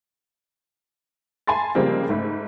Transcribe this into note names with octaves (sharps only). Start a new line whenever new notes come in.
G#5 A5 B5 C6 A6
C#3 F3 G3 G#3 A#3 C4
G#2 A3 B5